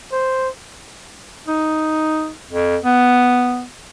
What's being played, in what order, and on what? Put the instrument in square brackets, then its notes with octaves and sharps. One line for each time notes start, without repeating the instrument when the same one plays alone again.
[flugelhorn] C5
[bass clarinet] D#4
F2
B3